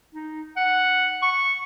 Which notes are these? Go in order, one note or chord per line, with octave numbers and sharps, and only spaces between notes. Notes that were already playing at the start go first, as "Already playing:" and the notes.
D#4
F#5
C#6